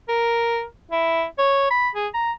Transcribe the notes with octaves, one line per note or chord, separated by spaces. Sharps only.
A#4
E4
C#5
B5
G#4
A#5